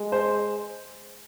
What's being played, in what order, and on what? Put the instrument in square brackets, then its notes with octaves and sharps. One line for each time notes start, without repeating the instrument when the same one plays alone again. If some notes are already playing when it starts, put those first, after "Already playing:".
Already playing: [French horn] G#3
[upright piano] C5